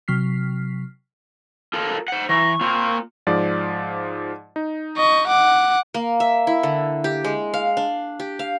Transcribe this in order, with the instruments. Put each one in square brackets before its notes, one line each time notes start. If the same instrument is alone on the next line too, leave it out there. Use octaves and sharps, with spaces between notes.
[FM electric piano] C3 F#3 F6 B6 C7
[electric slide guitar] F4 A4 A#4
C5 F#5
[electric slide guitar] E3 [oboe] A#5 [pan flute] C#6
[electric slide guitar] A#3 F4 [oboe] C4
[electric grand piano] G#2 F3 D5
D#4
[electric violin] D#5 C#6
F#5 D6
[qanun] A#3
E5
E4
D3
G4
G#3
F5
D4
G4
F5